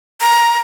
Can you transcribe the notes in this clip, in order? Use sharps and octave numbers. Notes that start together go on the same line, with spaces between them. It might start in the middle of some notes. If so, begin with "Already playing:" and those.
A#5